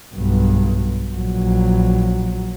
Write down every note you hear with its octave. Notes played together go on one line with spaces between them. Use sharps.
B1 G2
A#1 F#3